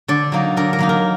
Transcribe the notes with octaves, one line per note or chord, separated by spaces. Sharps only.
D3 D5
F#3 A#3 D#4
D3 A#4
A#4
F#3 A#3 D#4
A#4